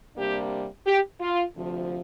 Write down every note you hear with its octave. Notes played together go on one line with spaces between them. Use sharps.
C3 G3 A#3 D4 G4
G4
F4
D2 C3 F3